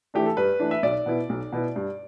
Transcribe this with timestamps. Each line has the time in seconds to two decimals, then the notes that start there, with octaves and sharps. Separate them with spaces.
0.14 E3 A3 D4 G4
0.26 A4
0.37 G2 B4
0.60 E3 A3 D4
0.71 E5
0.83 B1 D5
1.06 B2 B3 E4
1.29 B1
1.53 B2 B3 E4
1.76 G2